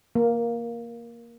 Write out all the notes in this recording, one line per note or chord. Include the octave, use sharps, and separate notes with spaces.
A#3